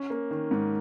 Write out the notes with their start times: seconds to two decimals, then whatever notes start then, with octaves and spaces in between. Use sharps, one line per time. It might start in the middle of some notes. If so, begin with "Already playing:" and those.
Already playing: C#4
0.10 A#3
0.31 D#3
0.51 G#2